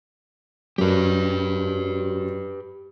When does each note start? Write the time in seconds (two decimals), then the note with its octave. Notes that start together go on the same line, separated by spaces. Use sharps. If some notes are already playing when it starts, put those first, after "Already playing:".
0.78 F#2 G4 B4